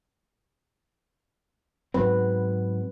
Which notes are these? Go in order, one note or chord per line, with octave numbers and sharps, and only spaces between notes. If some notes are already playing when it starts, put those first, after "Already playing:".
G#2 F#3 C4 B4